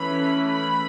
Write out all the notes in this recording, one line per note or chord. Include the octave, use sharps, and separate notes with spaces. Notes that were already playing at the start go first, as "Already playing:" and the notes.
Already playing: E3 A3 C#4 B5
B5